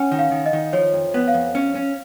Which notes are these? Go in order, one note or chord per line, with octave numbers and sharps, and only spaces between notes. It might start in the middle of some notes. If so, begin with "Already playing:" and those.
Already playing: C#4 F#5 G#5
D#3
F5
D#3
D#5
D#3
F3 C#5
F2
B3
F5
F2
C#4
C#4